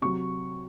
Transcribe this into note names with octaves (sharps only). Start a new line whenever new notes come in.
C3 F#3 C#6